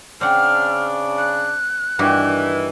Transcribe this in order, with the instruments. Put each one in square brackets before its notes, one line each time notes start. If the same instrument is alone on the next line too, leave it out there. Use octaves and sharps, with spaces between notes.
[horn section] C#3 D4 [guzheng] C4 F#5 [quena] F6
[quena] F#6
[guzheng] G2 F#4 G4 [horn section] D#3 E3